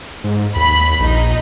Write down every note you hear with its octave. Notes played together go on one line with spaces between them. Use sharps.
G#2
D#2 B5
A#1 D#4